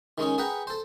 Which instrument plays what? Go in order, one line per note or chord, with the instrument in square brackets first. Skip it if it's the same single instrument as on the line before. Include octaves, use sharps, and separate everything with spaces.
[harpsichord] D#3 G#3 C#4 G#4
G#4 B4 F#5 G5 A#5
A4 C5